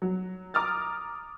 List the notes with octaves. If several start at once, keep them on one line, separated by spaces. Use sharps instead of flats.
F#3
A#5 D6 D#6 F6 A6